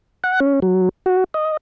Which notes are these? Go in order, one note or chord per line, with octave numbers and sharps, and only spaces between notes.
F#5
C#4
F#3
F#4
D#5